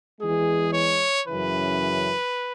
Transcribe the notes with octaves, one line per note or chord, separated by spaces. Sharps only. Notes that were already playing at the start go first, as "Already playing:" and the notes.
E2 E3 G#3 G#4
C#5
F#2 C#3 E3 B4